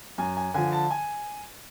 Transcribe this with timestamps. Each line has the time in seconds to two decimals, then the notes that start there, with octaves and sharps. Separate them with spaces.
0.18 F#2 G#5
0.37 G#5
0.54 D3 F3 G#5
0.73 A5
0.90 G#5